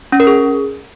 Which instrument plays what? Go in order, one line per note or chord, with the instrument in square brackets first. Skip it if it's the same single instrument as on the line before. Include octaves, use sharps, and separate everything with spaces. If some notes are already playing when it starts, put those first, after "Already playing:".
[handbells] C#4
A#4
G#4